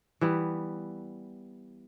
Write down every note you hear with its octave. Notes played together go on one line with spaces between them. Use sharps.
E3 G3 B3